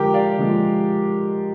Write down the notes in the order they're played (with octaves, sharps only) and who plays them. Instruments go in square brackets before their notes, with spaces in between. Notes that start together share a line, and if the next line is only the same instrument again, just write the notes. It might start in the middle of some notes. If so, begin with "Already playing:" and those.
Already playing: [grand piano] D3 F3 G#3 G4 A#4
D5 F5
D3 F3 G#3